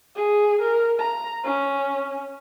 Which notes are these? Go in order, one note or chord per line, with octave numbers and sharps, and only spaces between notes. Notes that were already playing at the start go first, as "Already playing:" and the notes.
G#4
A#4
A#5
C#4